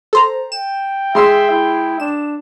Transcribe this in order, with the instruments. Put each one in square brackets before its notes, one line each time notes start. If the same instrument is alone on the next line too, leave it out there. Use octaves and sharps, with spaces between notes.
[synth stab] A4 C5 A#5
[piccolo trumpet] G5 [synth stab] E7
[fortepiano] G#3 C6 E6 [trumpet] E5
[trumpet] E4
[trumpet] D4 [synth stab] E7